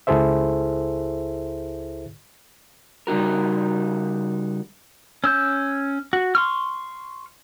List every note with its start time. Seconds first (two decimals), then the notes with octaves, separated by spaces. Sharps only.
0.07 C#2 E4 G#4 A4 C5 E5
3.07 C#3 G3 D#4 F#4 A#4
5.24 C#4 E6 G6
6.13 F#4
6.35 C6 C#6 F6